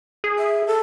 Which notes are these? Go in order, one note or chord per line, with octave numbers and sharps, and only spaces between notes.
G#4
E5
A4